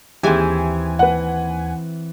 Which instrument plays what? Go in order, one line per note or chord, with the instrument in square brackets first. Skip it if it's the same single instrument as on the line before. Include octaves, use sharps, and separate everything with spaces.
[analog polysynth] D#2 G#5 [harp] E3 C4 [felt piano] G4 G#4
[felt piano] B4 F#5